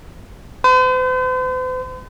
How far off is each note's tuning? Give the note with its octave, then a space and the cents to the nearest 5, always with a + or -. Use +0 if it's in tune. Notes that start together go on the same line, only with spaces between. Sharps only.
C5 -45